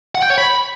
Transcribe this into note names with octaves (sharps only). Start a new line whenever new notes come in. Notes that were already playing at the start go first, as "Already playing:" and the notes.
F#5
G5
C#5
B5